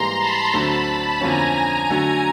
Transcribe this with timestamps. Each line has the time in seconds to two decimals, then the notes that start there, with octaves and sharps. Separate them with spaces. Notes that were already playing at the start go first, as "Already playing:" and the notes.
Already playing: G#2 E3 G3 A#3 A#5 C6
0.18 A5 B5
0.53 D2 D3 F#3 A3 C4
1.21 F2 D3 F3 A#3 C#4 G#5 A#5
1.55 G#5 A#5
1.90 D3 F#3 A3